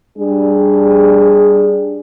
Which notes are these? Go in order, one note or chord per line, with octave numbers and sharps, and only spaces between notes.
G3 D4 G#4